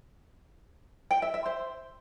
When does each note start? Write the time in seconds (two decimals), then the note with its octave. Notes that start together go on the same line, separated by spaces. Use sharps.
1.11 G5
1.22 E5
1.34 E5
1.46 C5